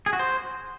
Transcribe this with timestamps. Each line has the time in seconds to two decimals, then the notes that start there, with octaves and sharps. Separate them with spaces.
0.06 G#4
0.13 F#4
0.19 C5